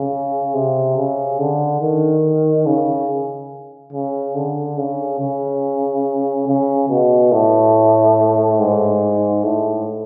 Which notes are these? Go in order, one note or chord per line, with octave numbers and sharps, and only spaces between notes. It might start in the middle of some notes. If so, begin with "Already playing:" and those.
Already playing: C#3
C3
C#3
D3
D#3
C#3
C#3
D3
C#3
C#3
C#3
B2
A2
G#2
A2